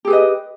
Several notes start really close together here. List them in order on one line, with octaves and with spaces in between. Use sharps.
G4 G#4 B4 D#5